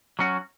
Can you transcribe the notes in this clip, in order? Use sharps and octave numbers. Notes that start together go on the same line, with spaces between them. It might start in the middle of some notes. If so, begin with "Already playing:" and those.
F#3 C#4 F#4